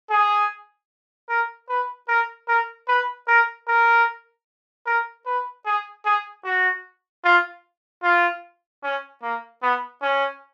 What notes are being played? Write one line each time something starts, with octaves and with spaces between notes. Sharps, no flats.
G#4
A#4
B4
A#4
A#4
B4
A#4
A#4
A#4
B4
G#4
G#4
F#4
F4
F4
C#4
A#3
B3
C#4